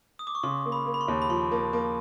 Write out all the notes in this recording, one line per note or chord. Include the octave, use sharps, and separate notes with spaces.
D#6
D6
C#6
C#3 C6
A#3
B5
A#3
B5
C6
D#2
B5
F3 C6
A#3
A#3